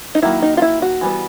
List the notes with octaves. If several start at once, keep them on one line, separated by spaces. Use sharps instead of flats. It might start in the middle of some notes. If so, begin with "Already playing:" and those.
D#4
D#3 F#3 A#3 E4
D#4
F4
E4
F#4
E3 G3 B3